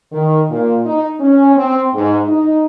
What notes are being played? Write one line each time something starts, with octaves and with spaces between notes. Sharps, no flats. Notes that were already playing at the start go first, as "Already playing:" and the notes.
D#3
A#2
D#4
C#4
C4
G#2
D#4